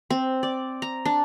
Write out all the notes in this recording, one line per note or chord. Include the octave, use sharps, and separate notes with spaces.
C4
D5
A#5
D4